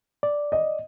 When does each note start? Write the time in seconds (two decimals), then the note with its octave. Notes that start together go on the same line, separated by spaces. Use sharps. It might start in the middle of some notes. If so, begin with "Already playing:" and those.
0.23 D5
0.52 D#5